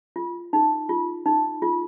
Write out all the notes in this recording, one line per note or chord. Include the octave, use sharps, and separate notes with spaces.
F4
D#4
F4
D#4
F4